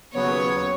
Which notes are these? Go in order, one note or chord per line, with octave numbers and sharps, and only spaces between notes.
D#2 C#3 F#3 B3 C#5